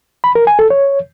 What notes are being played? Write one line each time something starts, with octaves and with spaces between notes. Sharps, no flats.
B5
A#4
G#5
A4
C#5